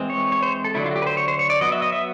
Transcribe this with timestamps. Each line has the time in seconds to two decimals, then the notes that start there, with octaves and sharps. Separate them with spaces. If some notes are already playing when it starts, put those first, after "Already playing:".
Already playing: E3 G#3 C4
0.10 C#5
0.32 C#5
0.43 C5
0.64 A4
0.74 D3 F#3 A3 E4
0.86 F4
0.91 F#4
0.96 G4
1.02 B4
1.07 C5
1.17 C#5
1.28 C5
1.39 C#5
1.50 D5
1.61 F#3 B3 D#5
1.72 E5
1.82 D#5
1.92 E5